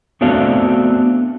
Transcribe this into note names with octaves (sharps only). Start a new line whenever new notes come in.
A3 B3 C4 D4 F#4 F5